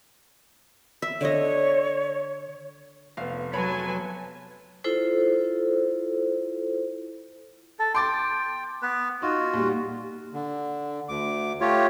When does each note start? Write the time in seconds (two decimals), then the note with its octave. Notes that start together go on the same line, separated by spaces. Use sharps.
1.02 E5
1.21 D3 C#5 D#5
3.17 F1 B3 F5
3.53 F#3 B4 C#5 G#5 A5 B5
4.84 E4 F4 A4 C5
7.79 A4
7.95 G5 C6 D6 A6
8.82 B3 B4
9.22 D#4 F4 F#4
9.53 A#2 G3
10.33 D3
11.09 D2 D6
11.61 A3 F4 G4 C#5